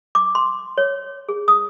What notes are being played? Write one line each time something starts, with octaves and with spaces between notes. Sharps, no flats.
D6
C6
C#5
G#4
D#6